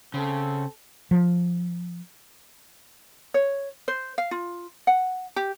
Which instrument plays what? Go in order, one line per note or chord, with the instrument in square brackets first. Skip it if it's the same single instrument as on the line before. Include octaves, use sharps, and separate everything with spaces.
[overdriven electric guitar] C#3 [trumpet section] C4 A4
[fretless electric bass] F3
[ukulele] C#5
C5
F5
F4
F#5
G4